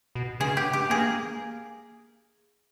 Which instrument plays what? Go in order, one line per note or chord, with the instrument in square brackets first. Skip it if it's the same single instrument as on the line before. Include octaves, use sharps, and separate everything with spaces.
[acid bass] B2
[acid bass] C#3 [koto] G#4
[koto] G4
G4
[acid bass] A#3 [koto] G#4